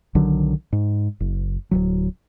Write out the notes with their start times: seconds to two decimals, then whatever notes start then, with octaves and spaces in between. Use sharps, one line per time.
0.15 B1 D3 D#3 F#3
0.73 G#2
1.20 F#1
1.71 D1 A#1 F#3